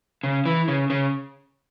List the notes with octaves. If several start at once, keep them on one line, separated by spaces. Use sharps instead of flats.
C#3
E3
C#3
C#3